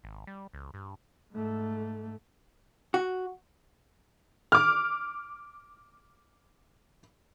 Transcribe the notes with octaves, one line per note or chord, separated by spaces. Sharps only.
G#1
G3
C#2
G2
G#2 A3
F#4
D6 F6